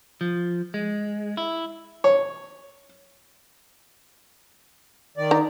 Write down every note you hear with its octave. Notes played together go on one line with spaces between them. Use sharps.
F3
G#3
E4
C#5
D#3 D5
D#4 A#5